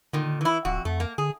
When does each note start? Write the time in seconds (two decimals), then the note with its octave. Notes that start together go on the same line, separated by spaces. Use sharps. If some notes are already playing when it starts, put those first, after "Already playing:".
0.13 A#2 D3 D#3
0.41 E3 E4
0.65 D1 F2 F#4
0.85 F2 A3
1.00 A#3
1.18 D3 G#4